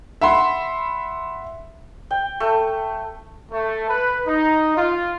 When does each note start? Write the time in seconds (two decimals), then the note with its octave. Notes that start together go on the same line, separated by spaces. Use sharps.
0.21 E5 F#5 B5 C6
2.11 G5
2.40 A3
3.51 A3
3.89 B4
4.26 D#4
4.76 F4